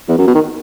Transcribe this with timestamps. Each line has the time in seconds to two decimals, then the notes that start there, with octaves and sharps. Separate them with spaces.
0.09 E2
0.18 F#2
0.27 B2
0.35 D#3